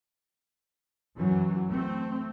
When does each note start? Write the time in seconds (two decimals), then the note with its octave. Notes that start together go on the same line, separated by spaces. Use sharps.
1.17 F#2 E3 F#3
1.69 A3 C4